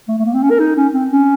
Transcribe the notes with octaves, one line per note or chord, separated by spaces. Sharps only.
A3
A3
A#3
C4
C#4
A#4
D#4
C#4
C4
C#4